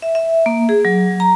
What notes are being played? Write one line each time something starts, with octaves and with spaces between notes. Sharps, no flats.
E5
E5
A#3
G#4
F#3
A#5